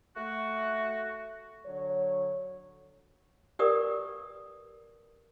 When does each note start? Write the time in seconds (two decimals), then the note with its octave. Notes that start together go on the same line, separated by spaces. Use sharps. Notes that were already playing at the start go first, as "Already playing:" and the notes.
0.17 A3 F#4
1.66 D3 F#3 C#5
3.59 G4 A#4 B4 D5 D#6